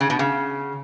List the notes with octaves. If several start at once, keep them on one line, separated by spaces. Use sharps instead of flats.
C#3
B2
C#3